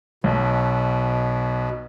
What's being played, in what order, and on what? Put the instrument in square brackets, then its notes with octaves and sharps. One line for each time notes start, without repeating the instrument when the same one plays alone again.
[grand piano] B1 [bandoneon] B2